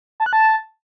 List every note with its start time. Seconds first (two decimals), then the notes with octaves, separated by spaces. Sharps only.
0.20 A5
0.26 F#6
0.33 A5